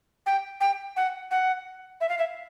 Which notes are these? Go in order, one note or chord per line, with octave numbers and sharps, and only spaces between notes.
G5
G5
F#5
F#5
E5
F5
E5